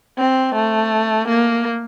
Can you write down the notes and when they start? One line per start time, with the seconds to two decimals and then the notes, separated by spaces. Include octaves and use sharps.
0.18 C4
0.55 A3
1.29 A#3